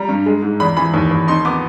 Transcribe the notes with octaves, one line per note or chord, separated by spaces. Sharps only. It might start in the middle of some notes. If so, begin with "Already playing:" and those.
Already playing: G3 A#5
G2
G#3
G#2
E2 B5
E3 B5
D#2
D#2
D#4 C6
B3 D6